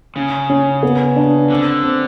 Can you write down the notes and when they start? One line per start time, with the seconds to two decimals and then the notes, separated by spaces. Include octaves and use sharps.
0.16 C#3 C#4
0.50 C#4
0.83 B3
1.16 D4
1.50 D3 C4
1.84 C4